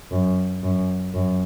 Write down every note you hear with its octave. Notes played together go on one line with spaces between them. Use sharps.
F#2
F#2
F#2